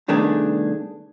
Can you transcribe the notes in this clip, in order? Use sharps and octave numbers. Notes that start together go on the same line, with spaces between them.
C2 D#3 A3 B3 D4 G#4